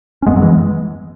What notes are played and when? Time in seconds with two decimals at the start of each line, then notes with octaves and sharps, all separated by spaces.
0.22 C#4
0.26 F#2 G#3 B3
0.36 F#3
0.42 E3 G#3